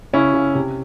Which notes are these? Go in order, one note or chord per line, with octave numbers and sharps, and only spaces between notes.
C#3 C#4 E4
C#3
C3